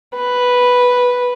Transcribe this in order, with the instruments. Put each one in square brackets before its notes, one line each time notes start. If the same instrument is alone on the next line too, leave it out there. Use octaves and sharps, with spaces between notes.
[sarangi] B4